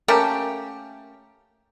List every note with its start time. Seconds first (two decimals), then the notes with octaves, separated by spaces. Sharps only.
0.08 A3 A#3 C#4 G4